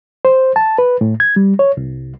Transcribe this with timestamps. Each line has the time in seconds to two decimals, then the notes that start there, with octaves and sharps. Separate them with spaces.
0.25 C5
0.56 A5
0.78 B4
1.01 A2
1.20 G#6
1.36 G3
1.59 C#5
1.77 C2